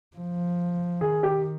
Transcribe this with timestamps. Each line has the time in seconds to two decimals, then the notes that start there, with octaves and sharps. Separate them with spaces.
0.17 F3
1.01 D#3 G#4
1.23 G4